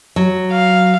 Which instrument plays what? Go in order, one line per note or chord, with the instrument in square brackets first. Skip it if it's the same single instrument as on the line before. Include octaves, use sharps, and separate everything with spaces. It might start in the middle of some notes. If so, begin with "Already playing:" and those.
[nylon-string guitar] F#3
[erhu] F5